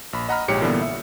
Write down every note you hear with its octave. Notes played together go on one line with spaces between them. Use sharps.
A#1 B5
D#5 F#5 A#5 B5 F6
A#1 G#2 G4 C#5 C#7
A#2 D3 E3 G3 B3
E5